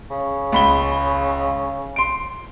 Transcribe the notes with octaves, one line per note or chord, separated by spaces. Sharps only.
C#3
C#2 B5 G7
C6 D7